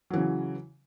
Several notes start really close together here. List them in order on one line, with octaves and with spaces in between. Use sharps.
F#3 E3 C#3